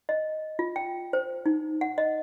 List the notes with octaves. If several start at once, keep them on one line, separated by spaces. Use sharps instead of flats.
D#5
F4
G5
C5
D#4
F#5
D#5